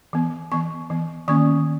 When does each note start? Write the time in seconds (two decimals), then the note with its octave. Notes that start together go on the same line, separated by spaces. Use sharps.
0.13 E3 B3
0.52 E3 B3 C#6
0.90 E3 B3
1.28 D#3 A#3 C#4 C#6